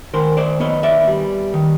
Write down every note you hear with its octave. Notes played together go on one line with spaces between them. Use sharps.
D#3 A#4 C5
C5 D5
B3 C#5 D#5
D5 E5
G3
D#3